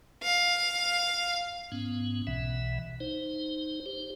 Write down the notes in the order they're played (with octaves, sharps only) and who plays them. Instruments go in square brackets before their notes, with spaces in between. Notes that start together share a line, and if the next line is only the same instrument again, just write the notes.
[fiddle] F5
[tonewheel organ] G#2 B3 C#4
B1 B2 E3 E5
D#4 C5
G4 C5